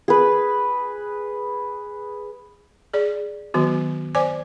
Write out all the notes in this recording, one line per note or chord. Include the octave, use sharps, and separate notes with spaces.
G#4 B4
G#4 D5
D#3 F#3 B3 F#4
C5 D5 G#5 D6